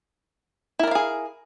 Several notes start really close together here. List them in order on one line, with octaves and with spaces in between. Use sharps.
E4 A#4 D5 F5 G#4